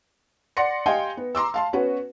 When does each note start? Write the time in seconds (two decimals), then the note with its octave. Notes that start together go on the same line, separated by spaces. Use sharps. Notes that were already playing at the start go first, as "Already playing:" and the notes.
0.57 D5 F#5 C6 A#6 C#7
0.86 G4 D#5 F5 G5 G#5 C6
1.17 B3
1.35 A#5 C6 D6 E6
1.54 F5 A5 C6
1.73 B3 C#4 F#4 B4